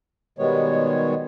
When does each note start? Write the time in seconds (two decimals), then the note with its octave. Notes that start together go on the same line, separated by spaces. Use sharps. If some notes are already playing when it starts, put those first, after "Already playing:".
0.39 B2 D#3 G3 G#3 B3 C#5